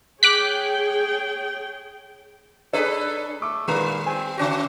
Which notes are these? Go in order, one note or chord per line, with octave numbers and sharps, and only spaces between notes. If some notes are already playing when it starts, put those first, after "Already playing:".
G#4 C#5 G5 D6 F#6 B6
D4 G#4 A4 B4 C#5
A3 D6
A#2 D#3 G3 B4 A#5
C4 G#5
C#3 C#4 F#4